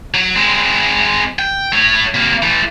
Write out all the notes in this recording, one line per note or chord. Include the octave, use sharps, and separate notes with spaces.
F#3
G#3 C4
G5
A3 C#5
C3 A#3
E3 A3